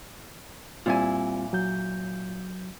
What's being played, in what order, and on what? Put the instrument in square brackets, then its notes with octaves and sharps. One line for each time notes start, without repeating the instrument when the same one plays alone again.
[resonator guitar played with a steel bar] A#2 E4 G#5 [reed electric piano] G3 C4 F4
[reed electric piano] F#3 G6